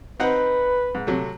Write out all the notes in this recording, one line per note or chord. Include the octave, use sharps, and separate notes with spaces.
C4 D#4 B4 F#5
G#2
C3 F#3 A3